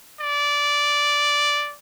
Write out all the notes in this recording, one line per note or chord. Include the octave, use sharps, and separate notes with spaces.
D5